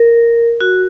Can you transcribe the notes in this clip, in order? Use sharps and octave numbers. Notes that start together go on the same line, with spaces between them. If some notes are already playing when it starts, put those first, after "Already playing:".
Already playing: A#4
F#4